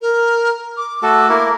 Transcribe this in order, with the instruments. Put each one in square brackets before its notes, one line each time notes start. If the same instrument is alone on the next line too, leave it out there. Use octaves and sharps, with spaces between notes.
[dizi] A#4
D6
[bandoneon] A3 F#4 A4
A#3 E4 A#4